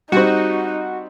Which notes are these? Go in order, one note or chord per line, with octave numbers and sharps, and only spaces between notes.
G3 C4 D#4 F#4